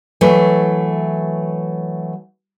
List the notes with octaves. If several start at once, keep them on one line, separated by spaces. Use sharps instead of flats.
E3 F#3 A3